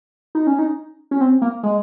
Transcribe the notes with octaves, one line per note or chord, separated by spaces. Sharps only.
D#4
C#4
D#4
C#4
C4
A#3
G#3